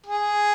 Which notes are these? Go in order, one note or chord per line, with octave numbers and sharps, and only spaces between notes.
G#4